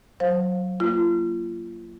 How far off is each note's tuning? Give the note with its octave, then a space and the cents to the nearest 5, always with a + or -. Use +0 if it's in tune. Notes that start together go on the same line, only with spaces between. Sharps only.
F#3 +0 C5 +15 F5 +10
A#3 +0 F4 -35